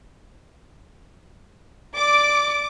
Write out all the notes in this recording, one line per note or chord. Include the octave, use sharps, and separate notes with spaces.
D5 D6